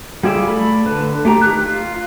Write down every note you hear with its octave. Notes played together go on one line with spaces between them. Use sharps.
G3 F4 G#4 D5 E5
A3 A4 D5 B5
D3 A4 B4
A3 G4 A#5
D#3 G4 F#6
F4